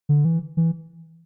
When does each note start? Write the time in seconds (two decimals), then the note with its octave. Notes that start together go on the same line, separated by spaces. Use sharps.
0.09 D3
0.25 E3
0.57 E3